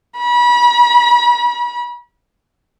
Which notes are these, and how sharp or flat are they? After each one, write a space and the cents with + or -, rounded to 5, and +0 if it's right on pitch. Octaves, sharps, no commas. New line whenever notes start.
B5 -35